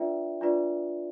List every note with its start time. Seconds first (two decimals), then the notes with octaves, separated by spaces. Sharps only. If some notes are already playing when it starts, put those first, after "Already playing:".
Already playing: D4 F4 B4 D5 E5 G5
0.41 D4 F4 B4 D5